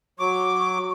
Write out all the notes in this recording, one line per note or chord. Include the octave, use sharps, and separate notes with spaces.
F#3 C#6 D6